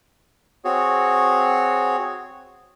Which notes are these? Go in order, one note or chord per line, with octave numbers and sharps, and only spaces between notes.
C4 F#4 G#4 C#5